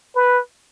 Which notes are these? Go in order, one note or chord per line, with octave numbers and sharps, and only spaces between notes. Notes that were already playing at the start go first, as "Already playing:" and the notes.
B4